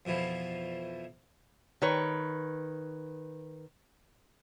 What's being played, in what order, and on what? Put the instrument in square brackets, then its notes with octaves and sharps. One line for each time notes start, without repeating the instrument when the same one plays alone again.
[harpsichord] F2 B2 E3 F3
[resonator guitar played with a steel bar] D#3 B4 C#5